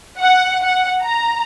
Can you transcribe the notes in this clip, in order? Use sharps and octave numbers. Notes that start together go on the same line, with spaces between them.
F#5
F#5
A#5